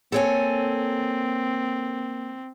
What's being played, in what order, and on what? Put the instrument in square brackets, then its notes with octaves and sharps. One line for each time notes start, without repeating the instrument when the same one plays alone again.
[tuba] A#3 [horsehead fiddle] C4 [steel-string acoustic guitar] A4 C#5 G#5